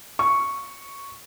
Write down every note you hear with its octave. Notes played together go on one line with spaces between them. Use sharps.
C#6